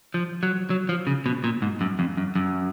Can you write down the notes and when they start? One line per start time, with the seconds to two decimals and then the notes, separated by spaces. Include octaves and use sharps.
0.14 F3
0.43 F#3
0.70 F#3
0.89 F3
1.07 C#3
1.26 B2
1.44 A#2
1.62 G#2
1.81 F#2
1.99 F2
2.17 F#2
2.36 F#2